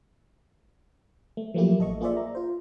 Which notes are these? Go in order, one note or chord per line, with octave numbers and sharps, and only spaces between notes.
A3
F3 F#3 A3 A#3 E4 G4
A1 A4 D#5 C#6
A#3 F4 G#4 C5 D5 E5
A#5
F4 C5